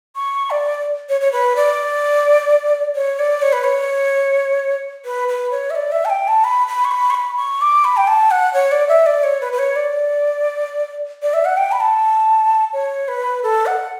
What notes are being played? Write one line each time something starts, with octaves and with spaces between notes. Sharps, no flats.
C#6
D5
C#5
C#5
B4
D5
C#5
D5
C#5
B4
C#5
B4
B4
C#5
E5
D5
E5
A5
G5
A5
B5
B5
C#6
B5
C#6
B5
C#6
D6
B5
G5
A5
F#5
C#5
D5
E5
D5
C#5
B4
B4
C#5
D5
D5
E5
F#5
G5
B5
A5
C#5
B4
A4
F#5